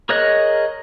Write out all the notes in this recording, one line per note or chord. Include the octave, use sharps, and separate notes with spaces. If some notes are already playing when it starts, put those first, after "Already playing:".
G#4 A#4 C#5 D#5 F#6